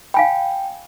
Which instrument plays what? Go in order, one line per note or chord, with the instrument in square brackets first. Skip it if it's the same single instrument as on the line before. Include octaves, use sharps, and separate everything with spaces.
[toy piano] F5 G#5 B5 [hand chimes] G5